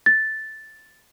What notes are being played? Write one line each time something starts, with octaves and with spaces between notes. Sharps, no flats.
A6